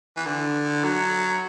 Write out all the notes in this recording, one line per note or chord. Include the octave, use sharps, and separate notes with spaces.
E3
D3
F#3